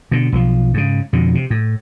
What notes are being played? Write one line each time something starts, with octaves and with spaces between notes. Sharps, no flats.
B2 D3
B1 E3 F3
G#2 C#3
F2 B2 D3
C3
A2